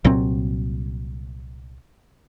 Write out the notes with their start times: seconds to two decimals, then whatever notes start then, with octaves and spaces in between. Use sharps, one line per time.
0.05 C2 A#2 F#3 C4